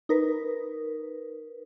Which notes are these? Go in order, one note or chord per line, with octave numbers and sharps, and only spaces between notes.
D#4 A#4 B4